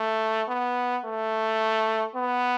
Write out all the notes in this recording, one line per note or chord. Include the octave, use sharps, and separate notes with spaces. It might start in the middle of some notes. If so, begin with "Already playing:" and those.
Already playing: A3
B3
A3
B3